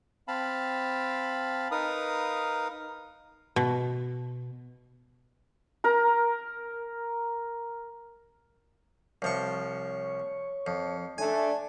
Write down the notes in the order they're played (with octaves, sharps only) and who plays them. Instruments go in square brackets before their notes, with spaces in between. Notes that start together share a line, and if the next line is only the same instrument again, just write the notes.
[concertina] C4 F5 A5 B5
D#4 A#4 B4 F5 D#6
[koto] B2
[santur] A#4 A#5
[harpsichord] C2 F3 C#6 [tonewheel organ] C#5
[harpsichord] F2
[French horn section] A3 D4 [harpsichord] G#5